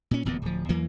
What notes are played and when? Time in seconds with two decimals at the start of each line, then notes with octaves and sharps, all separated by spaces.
0.11 A#2 C#4
0.25 D1 E2 A#2 B3
0.42 D1 F3
0.69 E2 E3 F#3 A#3